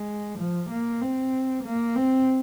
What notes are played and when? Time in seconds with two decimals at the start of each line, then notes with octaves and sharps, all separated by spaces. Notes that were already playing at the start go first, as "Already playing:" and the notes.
Already playing: G#3
0.39 F3
0.70 A#3
1.02 C4
1.64 A#3
1.95 C4